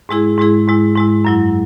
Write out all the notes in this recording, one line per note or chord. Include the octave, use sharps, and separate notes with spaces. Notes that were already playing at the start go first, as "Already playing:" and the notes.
G#2 G#3 E4 G#4
G#2 G#3 E4 G#4
G#2 G#3 E4
G#2 G#3 E4
F#2 F#3 E4